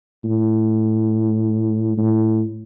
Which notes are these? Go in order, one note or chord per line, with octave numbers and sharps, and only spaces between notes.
A2
A2